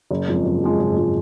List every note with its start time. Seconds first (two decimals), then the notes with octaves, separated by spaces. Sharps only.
0.11 F#1
0.28 F2 F3 G#3
0.45 F#1
0.62 F2 F3 G#3
0.79 F#1
0.96 F3 G#3